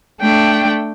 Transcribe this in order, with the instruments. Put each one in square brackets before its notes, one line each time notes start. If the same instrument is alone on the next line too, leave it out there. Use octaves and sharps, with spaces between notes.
[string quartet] A3 D4 G5